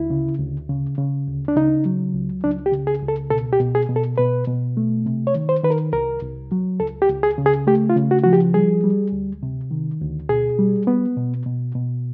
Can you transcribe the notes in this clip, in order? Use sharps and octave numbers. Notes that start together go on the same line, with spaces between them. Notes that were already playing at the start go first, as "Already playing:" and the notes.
Already playing: D2 E4
C#3
D2
C#3
C#3
D2
D4
C#3 D#4
F#3
C#2
C#2 D4
G4
C#3
G#4
C#2
A4
B2 A4
G4
B2
G#4
B2
A4
B2 B4
B2
A3
C3
C#5
D#3
C5
D#3 B4
A#4
C2 A#4
C2
F#3
C#2 A4
G4
C#2
G#4
C#3
G#4
A3 G4
F4
C#3
F#4
F3 F#4
G4
G3 G#4
G3
D2
C3
D#3
D2
B2 G#4
G3
B3
B2
B2
B2